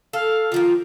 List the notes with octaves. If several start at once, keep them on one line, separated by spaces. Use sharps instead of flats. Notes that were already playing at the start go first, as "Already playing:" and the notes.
A4 F5
D#3 F3 A#3 F4